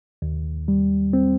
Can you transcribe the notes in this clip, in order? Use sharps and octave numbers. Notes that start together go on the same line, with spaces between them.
D#2
G3
C4